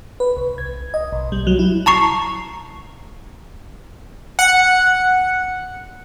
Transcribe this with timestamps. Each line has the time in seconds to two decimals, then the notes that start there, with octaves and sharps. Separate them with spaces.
0.20 B4
0.37 C2
0.58 G#6
0.94 D#5
1.12 B1
1.32 G3
1.47 F#3
1.59 E4
1.86 A5 A#5 C#6 C7
4.39 F#5 C#7